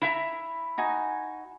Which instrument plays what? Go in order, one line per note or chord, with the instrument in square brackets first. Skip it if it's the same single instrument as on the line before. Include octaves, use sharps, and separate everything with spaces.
[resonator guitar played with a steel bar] E4 E5 A#5
[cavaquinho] D#4 F#4 G#5